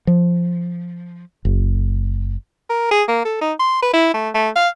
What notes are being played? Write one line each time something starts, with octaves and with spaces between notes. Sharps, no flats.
F3
F#1
A#4
G#4
A#3
A4
D#4
C6
B4
E4
A3
A3
F5